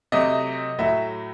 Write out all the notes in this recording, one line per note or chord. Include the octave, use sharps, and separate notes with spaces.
C3 F#3 A3 D#5
A2 F#3 A3 E5